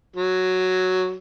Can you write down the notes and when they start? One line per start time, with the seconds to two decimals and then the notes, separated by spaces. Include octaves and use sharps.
0.16 F#3